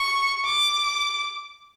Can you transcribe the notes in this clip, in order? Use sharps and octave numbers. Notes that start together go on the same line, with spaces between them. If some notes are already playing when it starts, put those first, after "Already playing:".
Already playing: C#6
D6